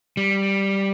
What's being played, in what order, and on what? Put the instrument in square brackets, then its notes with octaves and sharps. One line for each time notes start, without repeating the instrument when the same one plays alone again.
[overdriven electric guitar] G3